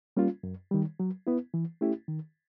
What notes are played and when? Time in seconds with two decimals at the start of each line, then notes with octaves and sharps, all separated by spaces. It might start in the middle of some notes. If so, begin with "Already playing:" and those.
0.17 G3 A#3 C#4 F4
0.43 F#2
0.71 D#3 G3
1.00 F#3
1.27 B3 E4
1.54 E3
1.81 A3 C#4 E4 G4
2.08 D#3